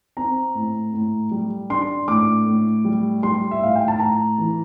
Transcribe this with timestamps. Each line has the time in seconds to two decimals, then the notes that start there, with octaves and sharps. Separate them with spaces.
0.17 C4 A#5
0.55 A2
0.94 A2
1.31 G3
1.70 D4 C6
2.08 A2 D6
2.46 A2
2.85 G3
3.23 G3 C6
3.51 E5
3.61 A2 F5
3.75 G5
3.88 A5
4.00 A2 A#5
4.38 E3